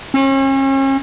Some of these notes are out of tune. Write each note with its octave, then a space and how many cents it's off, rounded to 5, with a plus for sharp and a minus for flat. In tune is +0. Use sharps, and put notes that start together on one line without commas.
C#4 -40